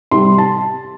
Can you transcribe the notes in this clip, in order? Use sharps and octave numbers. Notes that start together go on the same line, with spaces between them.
C3 G3 C4 C6
A5